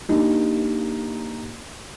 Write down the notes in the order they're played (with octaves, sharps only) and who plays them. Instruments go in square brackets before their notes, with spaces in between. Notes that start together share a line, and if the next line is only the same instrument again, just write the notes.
[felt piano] A#3 D4 D#4 G4